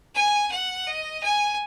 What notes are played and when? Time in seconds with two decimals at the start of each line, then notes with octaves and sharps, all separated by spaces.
0.15 G#5
0.51 F#5
0.87 D#5
1.23 G#5